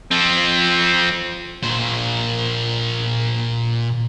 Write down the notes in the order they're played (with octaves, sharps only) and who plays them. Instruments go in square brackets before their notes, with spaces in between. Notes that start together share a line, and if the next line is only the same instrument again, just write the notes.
[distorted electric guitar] F3 C4
A#2 C5